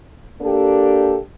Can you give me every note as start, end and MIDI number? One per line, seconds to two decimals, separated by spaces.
0.41 1.18 58
0.41 1.18 62
0.41 1.18 67
0.41 1.18 69